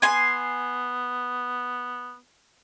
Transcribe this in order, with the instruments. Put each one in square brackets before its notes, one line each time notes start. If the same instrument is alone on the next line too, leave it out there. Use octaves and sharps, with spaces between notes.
[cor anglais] B3 [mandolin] G#5 C6